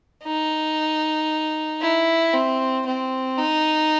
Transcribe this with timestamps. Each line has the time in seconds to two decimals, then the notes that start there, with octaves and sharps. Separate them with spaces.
0.24 D#4
1.81 E4
2.34 C4
2.86 C4
3.38 D#4